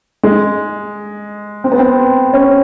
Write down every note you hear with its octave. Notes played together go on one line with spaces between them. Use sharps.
G#3
C4
B3
C4
C#4